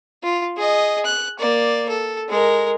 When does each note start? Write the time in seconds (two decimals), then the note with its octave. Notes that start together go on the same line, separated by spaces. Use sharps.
0.23 F4
0.56 G#4 D#5
1.05 F#6
1.39 A#3 D5
1.89 A4
2.29 G#3 A#4